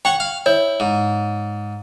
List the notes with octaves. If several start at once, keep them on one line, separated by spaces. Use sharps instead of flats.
C#5 F#5 G5 C#6
F5
E4 C#5
G#2